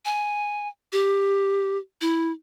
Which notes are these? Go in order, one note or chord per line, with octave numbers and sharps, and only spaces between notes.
G#5
G4
E4